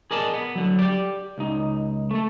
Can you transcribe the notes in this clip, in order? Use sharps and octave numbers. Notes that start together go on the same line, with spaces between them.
G#4 A#4 D5 D#5 A5
B3
D3 F#3
G4 D5
C#2 D#4
A3 A4